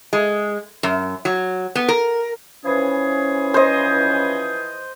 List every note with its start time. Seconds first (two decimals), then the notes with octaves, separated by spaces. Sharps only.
0.13 G#3
0.83 F#2
1.25 F#3
1.75 B3
1.88 A#4
2.65 E3 F3 C#4 G#4
3.54 C5 D#5